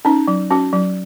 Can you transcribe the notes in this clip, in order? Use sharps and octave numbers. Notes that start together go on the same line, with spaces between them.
C#4 D#4
F#3
C#4 F#4
F#3